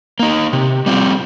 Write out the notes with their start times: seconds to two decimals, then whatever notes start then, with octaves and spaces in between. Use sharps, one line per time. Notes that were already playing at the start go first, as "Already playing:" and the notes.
0.19 A#3 D#4
0.53 C3
0.86 G3 C4 F4